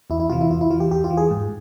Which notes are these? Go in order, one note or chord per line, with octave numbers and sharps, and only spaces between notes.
E2 E4
E4
C3 E3 F4
E4
E2 F4
E4
E3 F4
G4
E2 G4
F4
E3
G#4
G#2